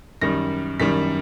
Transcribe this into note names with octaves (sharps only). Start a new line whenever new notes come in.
F#2 D#3 G3 A#6
F#2 D#3 G3 B6